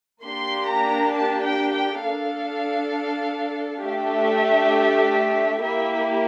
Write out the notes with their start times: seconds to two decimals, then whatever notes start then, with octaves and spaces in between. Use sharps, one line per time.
0.23 A#3 D4 G4 C6
0.68 A#5
1.14 A5
1.44 G5
1.73 G5
2.03 D4 A4 F5
3.84 A3 D4 G4 E5
5.64 A#3 E4 G4 E5